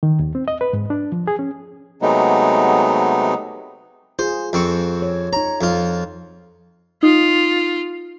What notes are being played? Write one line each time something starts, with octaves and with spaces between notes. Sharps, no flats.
D#3
D#2
C4
D#5
B4
G#2
D4
F3
G#4
C#4
C3 F#3 G#3 A3 B3 D#4
F4 G#4 C5
F2 C4 C#6
C#5
D#4 C#5 A#5
F2 F4
D#4 F4